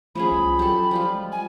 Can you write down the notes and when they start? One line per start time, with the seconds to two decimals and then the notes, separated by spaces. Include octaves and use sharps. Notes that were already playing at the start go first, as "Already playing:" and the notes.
0.15 F3 A3 C#4 G#4 B5
0.31 C2
0.59 F#3 G4 A4
0.91 F3 G3 F4
1.15 G#3
1.32 G#5